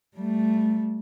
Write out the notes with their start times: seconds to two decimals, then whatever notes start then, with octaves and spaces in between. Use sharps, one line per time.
0.16 G3 A3